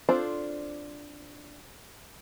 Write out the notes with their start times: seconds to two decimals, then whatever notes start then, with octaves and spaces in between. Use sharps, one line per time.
0.09 C4 D4 F4 A4 C5